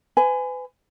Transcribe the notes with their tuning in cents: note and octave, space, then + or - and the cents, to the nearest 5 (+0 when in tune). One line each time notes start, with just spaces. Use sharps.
B4 +35 G#5 +0